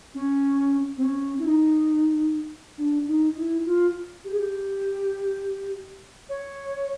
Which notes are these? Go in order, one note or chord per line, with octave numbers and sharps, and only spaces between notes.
C#4
C4
C#4
E4
D#4
D4
D#4
E4
F4
G4
G#4
G4
C#5